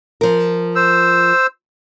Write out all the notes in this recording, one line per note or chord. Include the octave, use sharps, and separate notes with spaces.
F3 A#4
C5 E6